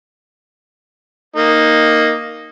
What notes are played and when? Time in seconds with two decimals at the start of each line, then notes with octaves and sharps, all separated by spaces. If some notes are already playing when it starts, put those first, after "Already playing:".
1.36 A#3 D#4